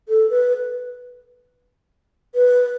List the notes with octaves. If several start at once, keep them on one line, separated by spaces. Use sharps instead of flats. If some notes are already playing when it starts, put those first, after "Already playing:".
A4
B4
B4